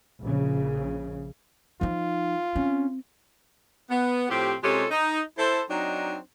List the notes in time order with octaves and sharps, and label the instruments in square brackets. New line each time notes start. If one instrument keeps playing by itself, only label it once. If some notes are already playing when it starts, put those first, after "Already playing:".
[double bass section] A#1 C#3
[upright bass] F3 D#4 [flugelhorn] F4
[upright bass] C4 [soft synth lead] C#4
[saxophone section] B3
A2 F3 C4 G4
C3 G#3 C#4 F4 G4 A4
D#4
E4 A4 C5
F#3 C4 D4 D#4